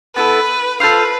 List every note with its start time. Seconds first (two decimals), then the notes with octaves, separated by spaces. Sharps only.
0.15 B3 E4 A4 B4
0.80 F4 A4 B4 C5 F5